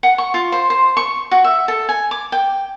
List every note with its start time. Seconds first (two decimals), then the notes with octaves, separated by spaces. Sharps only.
0.03 F#5
0.18 C#6
0.34 F4
0.52 C5
0.70 C5
0.97 C#6
1.31 F#4
1.44 E5
1.68 A4
1.89 G#5
2.11 D6
2.32 G5